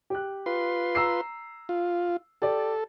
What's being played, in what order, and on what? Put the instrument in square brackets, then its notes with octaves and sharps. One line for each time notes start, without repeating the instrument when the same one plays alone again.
[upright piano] G4 F#6
[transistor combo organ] F4 B4 C6
[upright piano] A#5 E6 C7
[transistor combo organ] F4
[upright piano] G4 D5 [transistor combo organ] A4